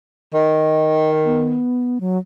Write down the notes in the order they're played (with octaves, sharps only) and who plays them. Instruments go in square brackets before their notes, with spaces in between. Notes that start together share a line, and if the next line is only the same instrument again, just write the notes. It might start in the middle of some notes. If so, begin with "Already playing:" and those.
[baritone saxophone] D#3 [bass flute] D#5
[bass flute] B3
F#3